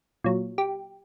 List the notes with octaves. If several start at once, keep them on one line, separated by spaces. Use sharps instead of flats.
A#2 F#3
G4